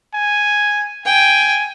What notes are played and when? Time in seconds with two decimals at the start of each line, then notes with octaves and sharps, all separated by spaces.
0.14 G#5
1.06 G5 G#5